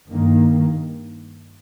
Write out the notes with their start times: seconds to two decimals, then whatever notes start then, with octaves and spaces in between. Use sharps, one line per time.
0.11 G2 D#3 A#3